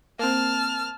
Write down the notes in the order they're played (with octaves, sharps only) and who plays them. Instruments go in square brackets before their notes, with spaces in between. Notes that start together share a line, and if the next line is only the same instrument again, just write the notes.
[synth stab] A#3 C4 [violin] A5 F6